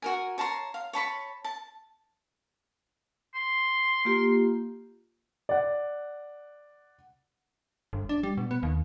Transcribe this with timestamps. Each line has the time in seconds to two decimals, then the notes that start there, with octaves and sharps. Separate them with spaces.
0.02 F#4 A#4 G#5
0.38 C#5 A5 A#5 C6
0.74 F5
0.93 C#5 A5 B5 C#6
1.44 A5
3.35 C6
4.05 A#3 F4 G4
5.49 D5 F#5
7.93 G1
8.09 D4
8.23 G3
8.37 B2
8.51 B3
8.63 D#2